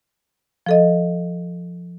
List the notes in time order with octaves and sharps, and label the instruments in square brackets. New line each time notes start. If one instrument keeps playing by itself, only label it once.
[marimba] F3 A4 D#5